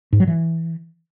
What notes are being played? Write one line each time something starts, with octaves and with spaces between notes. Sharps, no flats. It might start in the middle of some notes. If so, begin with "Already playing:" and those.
G#2
F#3
E3